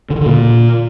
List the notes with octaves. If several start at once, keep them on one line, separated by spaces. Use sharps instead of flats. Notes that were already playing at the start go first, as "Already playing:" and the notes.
D3
D#3
D3
A#2